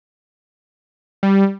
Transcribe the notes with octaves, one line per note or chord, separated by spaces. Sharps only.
G3